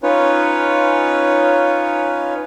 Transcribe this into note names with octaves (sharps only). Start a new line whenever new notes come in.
C#4 D#4 F4 B4 C#5